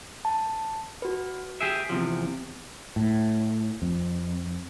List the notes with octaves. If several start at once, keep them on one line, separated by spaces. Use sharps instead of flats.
A5
F#4 B4
G4 G#4 E5 D7
E2 C3 F3
A2
F2